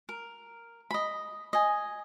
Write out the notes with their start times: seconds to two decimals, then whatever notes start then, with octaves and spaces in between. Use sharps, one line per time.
0.09 A#4
0.91 D#5 B5
1.53 D#5 G#5